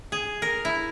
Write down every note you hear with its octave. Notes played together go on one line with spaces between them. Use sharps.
G#4
A#4
E4